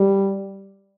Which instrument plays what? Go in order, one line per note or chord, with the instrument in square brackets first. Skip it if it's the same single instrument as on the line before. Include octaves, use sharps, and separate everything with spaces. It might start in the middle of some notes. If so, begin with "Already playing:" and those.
Already playing: [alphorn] G3